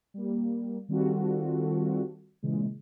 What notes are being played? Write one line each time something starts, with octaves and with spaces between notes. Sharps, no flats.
G3 A#3
D#3 G3 C4 F4 F#4 A4
A#2 C#3 E3 G#3